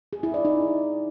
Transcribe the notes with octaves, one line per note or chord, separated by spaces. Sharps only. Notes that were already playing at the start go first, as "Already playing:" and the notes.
G#4
E4
D5
D#4